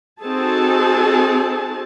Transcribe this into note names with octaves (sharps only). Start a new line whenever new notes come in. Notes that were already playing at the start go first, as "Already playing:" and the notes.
C4 D#4 F#4 G#4 A4 A5